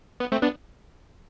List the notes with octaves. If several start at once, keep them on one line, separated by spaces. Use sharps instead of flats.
B3
A3 C4
B3 D4